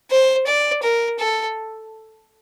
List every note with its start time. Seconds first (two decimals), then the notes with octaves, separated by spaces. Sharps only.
0.11 C5
0.47 D5
0.83 A#4
1.19 A4